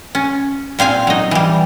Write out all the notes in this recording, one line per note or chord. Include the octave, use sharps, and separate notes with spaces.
C#4
A#2 C4 F5 G#5
F#3 D#4
E3 G3